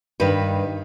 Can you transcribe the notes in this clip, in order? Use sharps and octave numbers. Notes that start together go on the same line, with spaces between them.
G2 D#3 B4